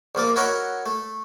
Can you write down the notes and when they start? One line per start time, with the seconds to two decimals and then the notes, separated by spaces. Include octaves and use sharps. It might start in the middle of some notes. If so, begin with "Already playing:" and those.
0.15 A#1 F3 A#3 D5
0.36 E4 F#4 A#4 C#5 D#5 F#5
0.86 A3